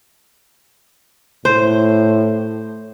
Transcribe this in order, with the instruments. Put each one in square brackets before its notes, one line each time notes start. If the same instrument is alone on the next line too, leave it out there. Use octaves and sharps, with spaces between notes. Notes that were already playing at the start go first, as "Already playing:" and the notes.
[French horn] A2 [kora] C5